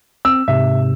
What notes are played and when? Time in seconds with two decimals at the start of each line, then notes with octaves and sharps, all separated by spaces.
0.25 C4 E6
0.48 G#2 C3 E5